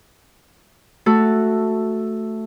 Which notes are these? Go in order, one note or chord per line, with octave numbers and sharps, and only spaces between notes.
A3 F#4 A4